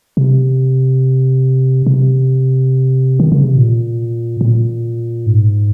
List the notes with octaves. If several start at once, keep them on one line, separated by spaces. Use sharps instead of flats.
C3
C3
D#3
C#3
C3
A#2
A#2
G#2